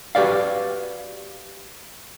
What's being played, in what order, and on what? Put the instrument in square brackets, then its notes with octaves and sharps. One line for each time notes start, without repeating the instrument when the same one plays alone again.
[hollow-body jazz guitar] F#4 G4 B4 D5 F5